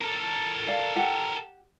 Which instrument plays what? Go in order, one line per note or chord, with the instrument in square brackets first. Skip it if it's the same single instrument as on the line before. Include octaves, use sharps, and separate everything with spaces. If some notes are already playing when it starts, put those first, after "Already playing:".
[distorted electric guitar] A4 A#4
[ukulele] D5 F5 A5
G4 F#5 G5